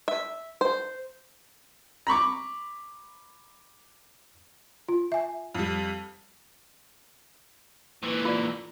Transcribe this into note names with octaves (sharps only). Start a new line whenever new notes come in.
E5
C5
A#5 B5 C#6 D6
F4
E5 G#5
F2 G3
A#2 E3
F4 D5